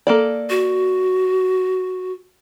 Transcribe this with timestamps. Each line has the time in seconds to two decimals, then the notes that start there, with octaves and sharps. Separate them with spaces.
0.07 A#3 A4 D5
0.50 F#4